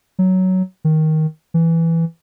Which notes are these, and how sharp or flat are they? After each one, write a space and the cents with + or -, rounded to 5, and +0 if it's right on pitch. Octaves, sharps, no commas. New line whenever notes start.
F#3 +10
D#3 +10
E3 +5